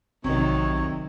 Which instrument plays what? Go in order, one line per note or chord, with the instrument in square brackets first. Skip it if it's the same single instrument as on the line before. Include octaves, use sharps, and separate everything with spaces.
[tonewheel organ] A#1 [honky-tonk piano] C3 [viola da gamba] D#3 F#3 [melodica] C#5